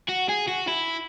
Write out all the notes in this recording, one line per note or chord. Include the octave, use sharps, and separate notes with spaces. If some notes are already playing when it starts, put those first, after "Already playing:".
F#4
G#4
F#4
E4